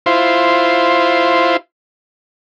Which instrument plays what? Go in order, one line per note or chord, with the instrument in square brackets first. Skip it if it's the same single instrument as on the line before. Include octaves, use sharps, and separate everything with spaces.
[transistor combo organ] E4 F4 C5